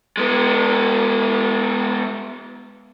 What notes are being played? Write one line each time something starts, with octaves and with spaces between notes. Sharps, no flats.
G#3 B3